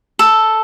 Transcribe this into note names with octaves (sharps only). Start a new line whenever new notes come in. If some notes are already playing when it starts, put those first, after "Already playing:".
A4